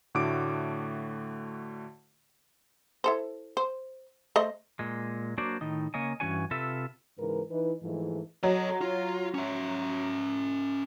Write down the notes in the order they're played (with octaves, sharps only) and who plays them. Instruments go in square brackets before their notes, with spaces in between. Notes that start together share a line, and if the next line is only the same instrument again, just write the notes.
[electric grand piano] A2 D3 A3 F#4 D6 D7
[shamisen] E4 A4 C5
C5
A3 C5 D#5
[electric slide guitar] A#2 G#3
F#3 A#3 D4 F#4 C5 D5
A2 D#3 D#4
C#3 A#3 C#5 D#5 G#5
G2 E3 C#4 F#4 C#5 G#5
C3 F4 A4 B4 E5
[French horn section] G#2 C#3 E3 A#4 B4
E3 D#4 E4 B4
G#2 E3 F3 G#3 A3
[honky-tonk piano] F#3 [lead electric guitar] A4 D#5
[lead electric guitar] F4
C#4 E5